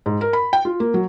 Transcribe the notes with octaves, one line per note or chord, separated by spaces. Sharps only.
G#2
A#4
B5
G5
F4
A#3
F#3